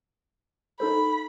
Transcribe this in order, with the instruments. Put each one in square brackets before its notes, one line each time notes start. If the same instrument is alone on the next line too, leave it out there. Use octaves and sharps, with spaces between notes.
[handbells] D#4 A4 C5 [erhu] B5